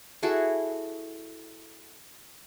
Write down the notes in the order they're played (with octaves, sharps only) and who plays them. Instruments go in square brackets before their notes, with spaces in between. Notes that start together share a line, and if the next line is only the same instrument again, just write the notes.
[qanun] E4 F#4 G#4 A4